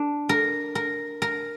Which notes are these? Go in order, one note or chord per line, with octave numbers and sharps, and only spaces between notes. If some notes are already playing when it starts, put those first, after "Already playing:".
Already playing: D4
A#4
A#4
A#4